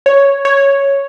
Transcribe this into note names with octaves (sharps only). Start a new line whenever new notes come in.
C#5
C#5